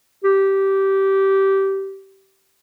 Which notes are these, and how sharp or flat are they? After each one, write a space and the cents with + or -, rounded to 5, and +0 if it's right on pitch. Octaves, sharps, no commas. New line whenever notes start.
G4 -15